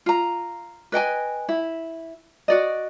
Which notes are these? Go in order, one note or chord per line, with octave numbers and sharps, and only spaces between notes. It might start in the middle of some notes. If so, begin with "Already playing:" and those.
F4 A#5
B4 D#5 G5 G#5
E4
F#4 D5 D#5